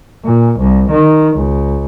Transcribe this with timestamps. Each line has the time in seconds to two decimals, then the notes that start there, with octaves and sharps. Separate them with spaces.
0.24 A#2
0.59 C2
0.90 D#3
1.36 C#2